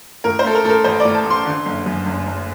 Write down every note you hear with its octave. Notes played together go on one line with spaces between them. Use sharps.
A2 A#4
C5
A3 A4
A#4
A2 A4 A#4
A1 C5
A2 D5
A5
A1 C6
D3
F#1
F#2
F#1
F#1